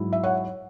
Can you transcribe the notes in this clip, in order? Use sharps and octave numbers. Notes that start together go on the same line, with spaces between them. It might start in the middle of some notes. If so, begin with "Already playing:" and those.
Already playing: G#2 F#3 E4
E5
C#5 F#5